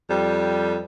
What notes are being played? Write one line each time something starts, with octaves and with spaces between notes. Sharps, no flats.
F2 G3